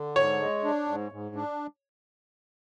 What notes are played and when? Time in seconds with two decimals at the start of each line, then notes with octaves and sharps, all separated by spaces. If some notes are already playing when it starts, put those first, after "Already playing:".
Already playing: D3
0.16 G#2 C#5
0.40 G#3
0.64 D4
0.87 G#2
1.12 G#2
1.35 D4